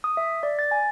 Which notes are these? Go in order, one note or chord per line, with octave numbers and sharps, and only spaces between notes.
D#6
E5
D5
A6
G#5